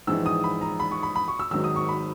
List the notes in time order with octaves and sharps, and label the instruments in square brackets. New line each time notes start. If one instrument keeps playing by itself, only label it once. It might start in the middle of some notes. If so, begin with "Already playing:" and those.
[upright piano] A#1 G#2 E3 G#3 E6
D#6
B5
A#5
B5
C#6
B5
B5
C#6
E6
G#1 G#2 D#3 F#3 E6
D#6
C#6
B5